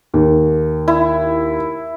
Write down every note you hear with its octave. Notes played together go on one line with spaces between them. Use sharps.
D#2
E4